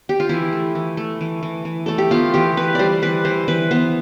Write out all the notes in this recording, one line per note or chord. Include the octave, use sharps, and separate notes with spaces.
G4
F4
E3 E4
A3
E3
A3
E3
E3
E3
A3 A4
G4
B3 F4
E3 G4
E3 B4
G3 C5 D5
E3 B4
E3 C5
E3 B4
B3 C5